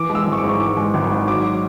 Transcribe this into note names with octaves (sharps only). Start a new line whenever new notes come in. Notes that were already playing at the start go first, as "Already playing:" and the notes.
Already playing: E3 D6
G#3
E6
G#1
C#6
D6
G#2
E3 D6
G#3
G#1 D6
G#2
F#3 D6